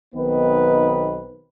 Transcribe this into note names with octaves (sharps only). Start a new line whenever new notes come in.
B1 D#3 B3 C4 D#4 B4